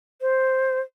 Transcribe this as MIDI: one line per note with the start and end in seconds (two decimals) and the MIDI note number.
0.21 0.80 72